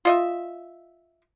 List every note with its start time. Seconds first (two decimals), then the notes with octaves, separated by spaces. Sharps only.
0.05 F4 D#5 E5